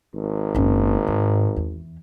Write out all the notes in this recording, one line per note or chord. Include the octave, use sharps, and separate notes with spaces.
G#1
F#1 C#4
G#2
E2